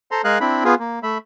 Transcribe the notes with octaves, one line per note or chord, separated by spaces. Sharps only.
A4 C5 A#5 C6
G#3 G#4 A#4 F5 G#5 F#6
C4 D4 E4 B5
B3 F4 G#4
A#3
A3 E5 B5